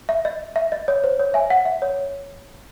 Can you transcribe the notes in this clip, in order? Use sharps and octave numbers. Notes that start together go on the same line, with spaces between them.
E5
D#5
E5
D#5
C#5
C5
C#5
E5 G#5
F#5
E5
C#5